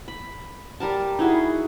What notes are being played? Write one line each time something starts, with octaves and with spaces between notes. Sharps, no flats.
B5
G3 A#4 A5
D#4 E4 F#4 G#4